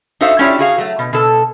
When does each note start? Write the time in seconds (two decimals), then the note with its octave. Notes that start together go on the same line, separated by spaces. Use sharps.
0.21 D#4 F#4 A4 C5 E5 F5
0.39 C#4 D4 E4 F4 G4 C#5
0.59 F#4 G#4 F5
0.78 F#3 A3
0.99 B2
1.13 B2 A4